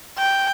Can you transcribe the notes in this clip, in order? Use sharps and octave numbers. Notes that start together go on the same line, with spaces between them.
G5